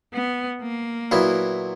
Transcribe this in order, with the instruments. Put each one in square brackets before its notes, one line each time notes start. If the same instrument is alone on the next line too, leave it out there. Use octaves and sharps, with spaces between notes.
[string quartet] B3
A#3
[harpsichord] A#2 F#3 B3 E4